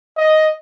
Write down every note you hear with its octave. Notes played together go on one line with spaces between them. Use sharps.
D#5